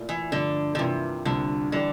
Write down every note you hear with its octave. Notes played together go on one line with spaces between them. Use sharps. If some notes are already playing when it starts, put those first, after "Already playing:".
Already playing: A#2 A3 E4 A#4 D5
E3
G2 D3 F3 A3
D3
G2 C3 E3 A#3 F4
C2 A#2 D3 G3 C4
D3 E3 G3 D4 A4